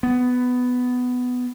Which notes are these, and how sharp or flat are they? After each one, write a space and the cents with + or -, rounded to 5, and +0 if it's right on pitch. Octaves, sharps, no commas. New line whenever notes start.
B3 +10